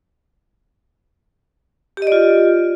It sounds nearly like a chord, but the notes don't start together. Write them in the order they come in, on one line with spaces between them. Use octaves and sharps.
G4 D#5 D5 F4